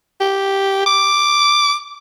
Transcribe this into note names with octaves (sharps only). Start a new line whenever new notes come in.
G4
D6